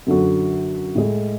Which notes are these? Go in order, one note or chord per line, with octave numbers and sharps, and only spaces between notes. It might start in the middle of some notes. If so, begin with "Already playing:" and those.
F#2 D3 F#3
A2 G#3